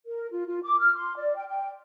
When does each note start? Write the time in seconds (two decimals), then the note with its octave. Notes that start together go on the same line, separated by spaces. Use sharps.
0.06 A#4
0.31 F4
0.47 F4
0.63 D6
0.80 F6
0.95 C6
1.16 D5
1.35 G5
1.48 G5